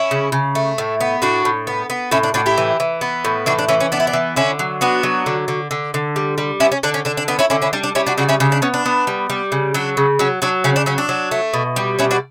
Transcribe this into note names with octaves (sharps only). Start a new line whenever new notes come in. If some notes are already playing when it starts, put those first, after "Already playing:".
Already playing: C#4 E4
C#3
C#3
A3
A2
B3
A2 D4 F#4
A2
B3
B3
A2 C#4 E4
D4
A2 D4 F#4
E4 G4
E3
E3
B3
A2
E3 D4 F#4
D4
E3 C#4
C#4
B3 D4
E4
D4
E3
D3 C#4 E4
F#3
B3 D4 F#4
F#3
D3
D3
D3
D3
G3
G3
B3 C#4 E4
C#4
D3 D4
C#4
D3 D4
D4
B3 D4
C#4 E4
D3 C#4 E4
C#4 E4
G3 D4
D4
G3 C#4 E4
D4 F#4
C#3 D4 F#4
C#4 E4
C#3 D4
D4
B3 C#4
D4
B3
G3
G3
C#3
F#3 D4
C#3
F#3 C#4
F#3 D4
C#3 C#4
D4
F#3 C#4
D4
F#3
A3
B2
G3
B2 C#4 E4
D4 F#4